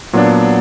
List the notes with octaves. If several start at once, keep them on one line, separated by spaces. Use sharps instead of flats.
A#2 F#3 B3 D4